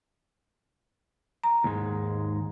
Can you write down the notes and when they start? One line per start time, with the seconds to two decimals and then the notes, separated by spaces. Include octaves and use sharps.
1.44 A#5
1.64 D#2 G#2 G#3